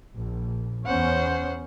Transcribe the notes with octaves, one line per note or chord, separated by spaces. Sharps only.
A#1
E2 B3 C#4 C5 F#5